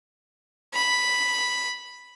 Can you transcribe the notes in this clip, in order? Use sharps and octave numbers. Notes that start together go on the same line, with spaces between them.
B5